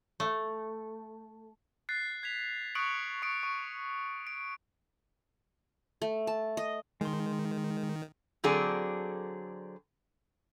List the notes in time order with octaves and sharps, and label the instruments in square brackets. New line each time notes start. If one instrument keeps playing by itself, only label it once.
[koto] A3
[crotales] F#6 A6 C7
G#6 B6 F7
C#6 D#6 F#6 C#7 D7 F#7
C#6 D#6 C#7 D7
C#6 D#7
D7
[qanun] A3
A5
D#5
[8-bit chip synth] D#3 [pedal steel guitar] G#3 C6
[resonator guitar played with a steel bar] D3 F#3 C4 G#4 A4 D5